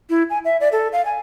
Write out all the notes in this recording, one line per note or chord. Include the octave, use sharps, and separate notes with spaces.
E4
G#5
E5
D5
A4
F5
G#5